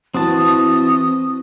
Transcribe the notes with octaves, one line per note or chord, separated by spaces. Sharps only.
E3 C4 F#4 A5 D#6